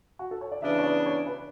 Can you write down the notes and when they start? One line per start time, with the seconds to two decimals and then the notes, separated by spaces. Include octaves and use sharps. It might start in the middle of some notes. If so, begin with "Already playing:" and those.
0.19 F#4
0.31 A4
0.41 C#5
0.52 D5
0.62 C#3 E3 B3 D4 E5
0.79 C#5
0.84 D5
1.06 C#5
1.27 B4